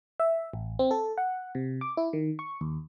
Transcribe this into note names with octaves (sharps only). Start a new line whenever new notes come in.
E5
A1
C4
A4
F#5
C3
D6
E4
D#3
C#6
D#2